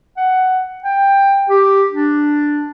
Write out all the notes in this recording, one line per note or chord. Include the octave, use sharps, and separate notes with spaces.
F#5
G5
G4
D4